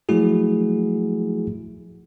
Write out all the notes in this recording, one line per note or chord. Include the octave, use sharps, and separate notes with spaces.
F3 F#3 A3 E4 F#4 G#4